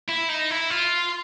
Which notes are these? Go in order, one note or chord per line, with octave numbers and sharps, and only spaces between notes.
E4
D#4
E4
F4